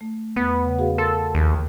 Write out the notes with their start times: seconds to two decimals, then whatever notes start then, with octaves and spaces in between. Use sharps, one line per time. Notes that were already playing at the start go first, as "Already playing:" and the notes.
0.01 A3
0.36 E2 B3
0.65 C#3 F#5
0.79 F#4 G#4 F5
0.98 A4 A#4 C6 A6
1.35 D#2